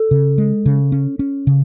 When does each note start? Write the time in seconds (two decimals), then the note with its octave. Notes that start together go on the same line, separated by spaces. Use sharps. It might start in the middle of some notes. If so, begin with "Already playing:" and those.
Already playing: A4
0.11 C#3
0.38 G#3
0.66 C#3
0.92 C#4
1.19 C#4
1.47 C#3